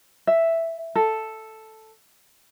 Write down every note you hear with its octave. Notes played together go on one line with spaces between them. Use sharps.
E5
A4